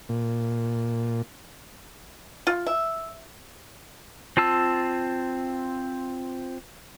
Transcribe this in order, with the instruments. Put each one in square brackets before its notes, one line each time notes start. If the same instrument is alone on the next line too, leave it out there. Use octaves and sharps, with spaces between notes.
[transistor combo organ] A#2
[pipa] F4
E5
[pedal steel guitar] C4 F4 A5 E6